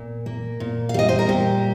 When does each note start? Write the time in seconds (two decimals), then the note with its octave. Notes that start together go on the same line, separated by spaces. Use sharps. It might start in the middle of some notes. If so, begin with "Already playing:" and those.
Already playing: A#2
0.26 A#3
0.60 A#2
0.89 F5
0.94 G3 D#5
1.09 C5
1.19 A#4
1.29 A#2 G4